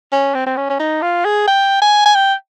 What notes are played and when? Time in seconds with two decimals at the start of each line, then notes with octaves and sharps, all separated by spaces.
0.12 C#4
0.35 C4
0.46 C4
0.57 C#4
0.70 C#4
0.80 D#4
1.02 F4
1.25 G#4
1.48 G5
1.82 G#5
2.06 G#5
2.15 G5